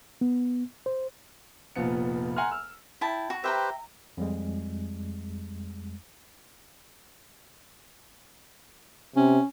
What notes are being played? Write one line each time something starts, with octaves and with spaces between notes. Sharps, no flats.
B3
C5
F1 A#2 F3 B3 C#7
F#5 G#5 A#5 C6 F6
E6 F6
E4 G5 A5
F#4
G4 B4 C5 E5 G5 A#5
F2 G3 G#3
C3 C#4